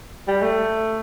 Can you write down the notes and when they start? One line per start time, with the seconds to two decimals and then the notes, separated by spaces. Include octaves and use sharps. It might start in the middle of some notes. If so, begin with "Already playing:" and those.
0.28 G3
0.42 A3